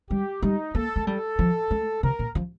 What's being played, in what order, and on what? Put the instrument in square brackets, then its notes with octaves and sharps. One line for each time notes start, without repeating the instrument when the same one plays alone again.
[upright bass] G3 [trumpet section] G4
[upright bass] G3 [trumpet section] D#4
[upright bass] A#3 [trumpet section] A4
[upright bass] A3
[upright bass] G3 [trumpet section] A4
[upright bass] F3
A3
[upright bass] C3 [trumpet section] A#4
[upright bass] A#2
F3